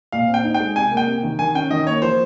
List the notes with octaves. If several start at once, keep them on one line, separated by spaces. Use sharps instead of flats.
A#2 F5
C4
G5
D#4
G5
G#3
C3 G#5
A#3
G5
C3
D#3
D#3 G#5
C#4 G5
D#3 D#5
A#3 C#5
F3 C5